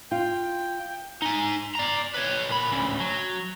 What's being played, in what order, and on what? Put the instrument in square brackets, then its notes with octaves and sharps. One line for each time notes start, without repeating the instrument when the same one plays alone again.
[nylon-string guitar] F4 [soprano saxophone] G5
[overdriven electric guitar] D#4 G#5
D5 A#5
B4 C#5
A#2 B5
D2 C#3
F#3